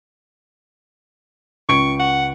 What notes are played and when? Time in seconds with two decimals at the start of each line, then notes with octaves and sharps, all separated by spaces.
1.69 C#2 C#6 D7
1.99 F#5